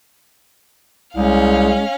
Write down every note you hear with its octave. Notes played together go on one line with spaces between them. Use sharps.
C2 G#3 C#4 F5